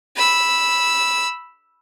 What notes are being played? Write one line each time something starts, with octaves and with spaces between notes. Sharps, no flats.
B5 E6